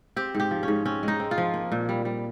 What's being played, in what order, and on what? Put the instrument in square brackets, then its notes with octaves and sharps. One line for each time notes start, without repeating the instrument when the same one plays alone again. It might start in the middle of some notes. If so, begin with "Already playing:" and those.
[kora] C4 G4
G#2
G4
F3
C#4
G#2
C4 C#4
G#3 D#4
C4
F4
F3
A#3
A#2
G3
G3